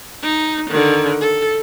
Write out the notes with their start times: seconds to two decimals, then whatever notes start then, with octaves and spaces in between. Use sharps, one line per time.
0.22 D#4
0.69 D3 D#3
1.21 A4